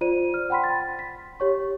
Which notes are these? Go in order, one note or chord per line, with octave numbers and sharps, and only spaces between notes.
F4 C5 D5 D#7
F6
F#5 G5 B5 C6 B6
A6
B6
G4 C#5 C#6